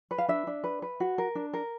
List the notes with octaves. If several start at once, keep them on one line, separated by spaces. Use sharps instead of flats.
B4
F5
D4 E5
D4
B4
B4
F#4
A#4
D4
A#4